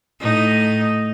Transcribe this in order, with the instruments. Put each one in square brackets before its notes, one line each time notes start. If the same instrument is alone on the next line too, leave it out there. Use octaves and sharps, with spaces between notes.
[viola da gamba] A2 D#4